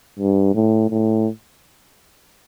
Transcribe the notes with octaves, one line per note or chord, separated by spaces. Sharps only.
G2
A2
A2